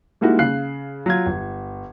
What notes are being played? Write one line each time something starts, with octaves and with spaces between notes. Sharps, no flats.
G3 G#3 A#3 D#4 E4 F#4
C#3 F5 F#6 C7
F#3 F4 G#6
G1